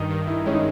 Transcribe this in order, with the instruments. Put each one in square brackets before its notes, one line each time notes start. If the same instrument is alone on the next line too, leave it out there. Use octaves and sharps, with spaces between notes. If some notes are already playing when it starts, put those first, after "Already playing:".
Already playing: [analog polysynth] G2 D#3 [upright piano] D#4
[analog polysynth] D#3
[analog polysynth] D#3 [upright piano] E4
[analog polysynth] G#3 [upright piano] C#4
[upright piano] D#4